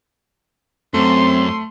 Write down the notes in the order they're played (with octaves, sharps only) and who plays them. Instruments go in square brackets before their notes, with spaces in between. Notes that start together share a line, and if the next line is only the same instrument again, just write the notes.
[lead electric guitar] F#2 [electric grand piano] A3 [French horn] C4 [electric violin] C6